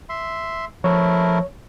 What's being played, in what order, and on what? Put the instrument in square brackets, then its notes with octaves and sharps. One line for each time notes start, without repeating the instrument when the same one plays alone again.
[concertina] E5 C6
[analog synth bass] F3 [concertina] A3 E4 A#4 [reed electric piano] C#5